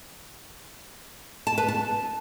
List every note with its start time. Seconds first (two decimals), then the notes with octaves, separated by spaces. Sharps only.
1.47 A5
1.58 B4
1.68 A5